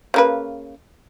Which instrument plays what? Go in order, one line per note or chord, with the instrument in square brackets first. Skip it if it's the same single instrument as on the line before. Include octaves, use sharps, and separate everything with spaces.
[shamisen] C#3 A#3 B4